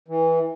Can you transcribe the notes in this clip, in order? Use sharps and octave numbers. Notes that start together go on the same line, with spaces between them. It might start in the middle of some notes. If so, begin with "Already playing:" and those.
E3